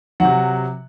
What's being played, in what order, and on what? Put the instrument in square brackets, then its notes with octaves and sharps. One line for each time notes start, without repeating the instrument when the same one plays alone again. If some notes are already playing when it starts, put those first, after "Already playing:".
[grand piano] C3 F#3 F#5